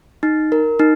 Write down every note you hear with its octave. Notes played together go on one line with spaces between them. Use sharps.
D#4
A#4
D#4